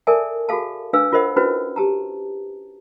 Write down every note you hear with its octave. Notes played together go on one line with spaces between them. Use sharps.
A4 A#4 D5 E5 G#5 A5
F#4 G#4 A4 F5 A5
D4 B4 F5 G#5 E6
D4 F4 A#4 C5 D#5 F#5
C#4 D4 E4 F#4 B4 C5
G4 A5 A#5